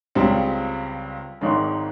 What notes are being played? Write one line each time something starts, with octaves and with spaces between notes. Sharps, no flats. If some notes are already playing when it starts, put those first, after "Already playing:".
C#2 C#3 G3 C4
G#1 G#2 D#3 G#3 C#4